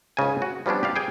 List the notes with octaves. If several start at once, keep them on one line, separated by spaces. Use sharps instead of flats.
C#2 G#2 C#3 G#5
F#4
F3 G3 B3 C#4 D4
G4 D5 F5
G#4 G5 G#5